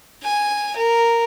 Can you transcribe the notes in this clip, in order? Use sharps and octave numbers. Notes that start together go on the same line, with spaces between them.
G#5
A#4